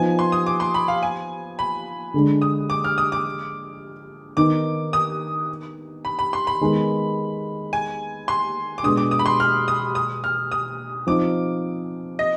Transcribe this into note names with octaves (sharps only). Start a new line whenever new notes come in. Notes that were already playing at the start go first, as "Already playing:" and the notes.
Already playing: F3 B3 D#4 G#5
C6
D#6
D6
C6
B5
F5
G#5
B5
D3 G#3 D4
D#6
D6
F6
D#6
D6
D#3 B3 D#4 D6
D#6
B5
B5
C6
B5
D#3 G#3 B3
G#5
C6
D6
B2 G#3 D4 D#6
D6
D#6
B5
C6
F6
D#6
D#6
F6
D#6
F3 C4 D#4 D6
D#5